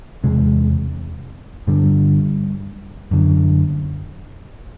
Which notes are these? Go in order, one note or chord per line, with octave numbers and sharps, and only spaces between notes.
E2 C3 G#3
G2 D3 G3
F#2 D3